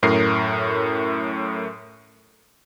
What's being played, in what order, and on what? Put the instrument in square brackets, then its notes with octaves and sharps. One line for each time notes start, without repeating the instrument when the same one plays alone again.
[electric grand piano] F#2 A2 A#4 C7